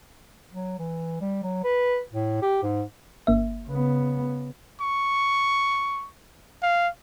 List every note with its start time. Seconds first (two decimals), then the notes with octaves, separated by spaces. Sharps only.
0.53 F#3
0.79 E3
1.21 G3
1.43 F#3
1.64 B4
2.12 A2
2.42 G4
2.63 G#2
3.27 G1 A#3 E5
3.67 C#3 B3
4.81 C#6
6.63 F5